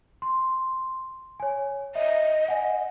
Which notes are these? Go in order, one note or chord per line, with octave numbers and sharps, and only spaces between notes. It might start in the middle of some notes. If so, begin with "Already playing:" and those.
C6
C#5 G#5
D#5 E5
F#5 G#5